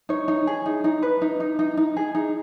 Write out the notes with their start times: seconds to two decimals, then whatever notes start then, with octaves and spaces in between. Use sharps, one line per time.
0.09 D#4 C#5
0.28 D#4
0.47 G#4
0.66 D#4
0.84 D#4
1.02 B4
1.22 D#4
1.40 D#4
1.59 D#4
1.77 D#4
1.97 G#4
2.15 D#4